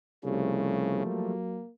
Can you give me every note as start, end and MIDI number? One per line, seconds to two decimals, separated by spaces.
0.24 1.02 36
0.24 1.02 49
0.24 1.31 53
0.24 1.31 55
0.24 1.31 57
1.06 1.61 54
1.06 1.71 58